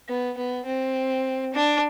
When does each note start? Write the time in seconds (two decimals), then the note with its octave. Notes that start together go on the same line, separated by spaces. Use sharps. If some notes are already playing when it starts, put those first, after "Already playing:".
0.08 B3
0.37 B3
0.65 C4
1.53 D4